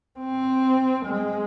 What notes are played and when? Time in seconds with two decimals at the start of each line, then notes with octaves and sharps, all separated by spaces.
0.20 C4
1.06 G#3